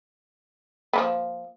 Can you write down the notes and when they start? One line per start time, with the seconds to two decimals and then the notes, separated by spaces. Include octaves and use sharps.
0.93 F3 A#3 B3